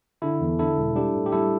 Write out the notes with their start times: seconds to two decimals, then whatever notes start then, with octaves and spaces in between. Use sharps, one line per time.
0.22 D3 E4 A4
0.40 E2
0.59 D3 E4 A4
0.77 E1
0.95 G3 D4 G4
1.15 A2
1.26 G4
1.32 G3 E4 A4